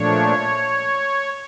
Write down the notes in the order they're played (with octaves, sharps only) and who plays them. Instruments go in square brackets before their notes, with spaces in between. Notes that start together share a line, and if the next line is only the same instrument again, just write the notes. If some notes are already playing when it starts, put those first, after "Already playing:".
Already playing: [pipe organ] A#2 F3 A3 D4 C#5